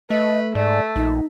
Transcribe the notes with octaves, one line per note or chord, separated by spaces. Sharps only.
A3 B4 D#5
G#2 A3 D5
A#1 D#4